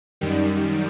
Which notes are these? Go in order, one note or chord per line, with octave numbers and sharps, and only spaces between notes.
F#2 D#3 G3